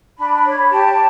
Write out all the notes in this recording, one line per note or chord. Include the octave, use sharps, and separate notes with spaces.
D4 B5
C#5
G4 A5